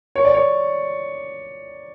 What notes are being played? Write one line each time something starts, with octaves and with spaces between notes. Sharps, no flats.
C#5
D5
C#5